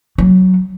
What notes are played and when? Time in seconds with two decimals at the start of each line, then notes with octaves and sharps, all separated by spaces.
0.18 F#3